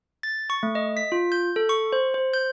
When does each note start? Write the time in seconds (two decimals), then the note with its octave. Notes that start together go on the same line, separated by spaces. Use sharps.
0.23 A6
0.50 C#6
0.63 A3
0.75 D#5
0.97 B6
1.12 F4
1.32 G6
1.56 A4
1.69 C#6
1.93 C5
2.14 C5
2.34 G6